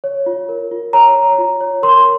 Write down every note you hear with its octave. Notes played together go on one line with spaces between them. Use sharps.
C#5
F4
A#4
F4
C#5 A#5
C#5
F4
C#5
A#4 C6